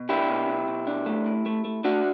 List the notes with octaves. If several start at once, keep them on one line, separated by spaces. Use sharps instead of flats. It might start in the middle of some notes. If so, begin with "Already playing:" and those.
Already playing: B2
D4 E4 G4
B2
B2
B2
D4
A3
A2
A3
A3
A3 D4 F#4